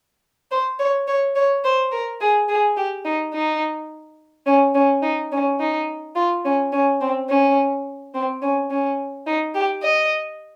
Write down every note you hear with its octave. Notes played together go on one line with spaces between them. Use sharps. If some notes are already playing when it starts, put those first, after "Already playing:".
C5
C#5
C#5
C#5
C5
A#4
G#4
G#4
G4
D#4
D#4
C#4
C#4
D#4
C#4
D#4
F4
C#4
C#4
C4
C#4
C4
C#4
C#4
D#4
G4
D#5